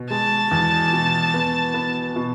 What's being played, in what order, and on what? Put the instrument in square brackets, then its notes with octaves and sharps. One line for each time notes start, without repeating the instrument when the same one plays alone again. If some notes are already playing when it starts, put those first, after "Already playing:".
Already playing: [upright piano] B2
[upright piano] G#3 [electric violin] A5
[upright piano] E2
B2
B3
B3
B2